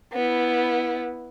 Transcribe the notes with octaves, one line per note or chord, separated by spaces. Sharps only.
B3 E4